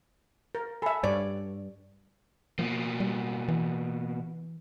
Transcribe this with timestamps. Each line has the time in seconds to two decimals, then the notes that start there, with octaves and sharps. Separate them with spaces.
0.55 A#4
0.82 A4 E5 G#5 B5
1.04 G2 C#5 D5
2.59 B2 F3 A#3
3.00 G3
3.48 E3